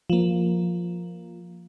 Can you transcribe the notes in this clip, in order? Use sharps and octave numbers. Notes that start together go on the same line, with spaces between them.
F3 A#3